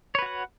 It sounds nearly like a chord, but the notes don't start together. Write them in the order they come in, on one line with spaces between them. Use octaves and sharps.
C#5 B4 F#4 F#5